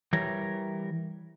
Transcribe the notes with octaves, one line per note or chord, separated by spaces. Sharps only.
E3 G3 A#4 C#5